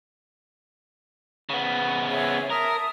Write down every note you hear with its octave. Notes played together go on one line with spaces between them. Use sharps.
C#3 B3
G#4 C#5 E5
A#4 E5 A5 D#6